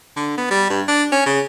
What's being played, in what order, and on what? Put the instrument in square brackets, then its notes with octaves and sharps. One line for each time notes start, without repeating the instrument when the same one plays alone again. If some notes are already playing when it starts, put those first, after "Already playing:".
[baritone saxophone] D3
B3
G3
G2
D4
C#4
C#3